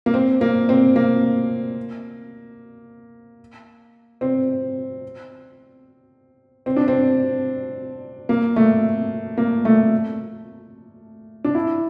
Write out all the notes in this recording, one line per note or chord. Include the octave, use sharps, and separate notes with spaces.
A#3
C4
A#3
C4
A#3
C4
C4
D4
C4
A#3
A3
A#3
A3
D4
E4